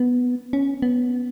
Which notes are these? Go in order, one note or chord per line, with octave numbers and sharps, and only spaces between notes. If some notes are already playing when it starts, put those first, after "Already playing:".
Already playing: B3
C#4
B3